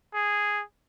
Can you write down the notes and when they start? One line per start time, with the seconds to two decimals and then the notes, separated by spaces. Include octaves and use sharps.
0.14 G#4